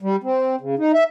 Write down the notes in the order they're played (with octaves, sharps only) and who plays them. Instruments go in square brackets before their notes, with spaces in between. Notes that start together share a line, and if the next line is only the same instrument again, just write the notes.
[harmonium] G3
C4
C#3
D#4
E5